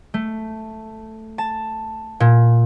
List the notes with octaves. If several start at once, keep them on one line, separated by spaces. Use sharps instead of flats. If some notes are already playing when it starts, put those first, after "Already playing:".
A3
A5
A#2